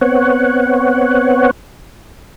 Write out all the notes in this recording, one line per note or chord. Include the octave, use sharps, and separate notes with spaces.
B3 C4 C#5 F#5